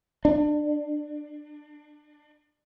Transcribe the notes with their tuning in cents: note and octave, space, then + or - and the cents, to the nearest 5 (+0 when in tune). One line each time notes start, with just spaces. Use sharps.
D4 +25